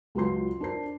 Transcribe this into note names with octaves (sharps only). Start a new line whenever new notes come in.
C#2 F#3 F4 B4 C6 C7
D4 A#4 C5 C7